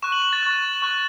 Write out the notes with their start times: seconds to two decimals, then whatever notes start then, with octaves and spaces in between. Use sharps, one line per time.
0.02 C#6 F#6 E7
0.12 F#7
0.22 E7
0.33 A6
0.43 C#6 F#6
0.82 C#6 F#6